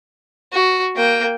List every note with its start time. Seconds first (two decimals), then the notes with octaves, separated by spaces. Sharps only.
0.52 F#4
0.96 A#3 G5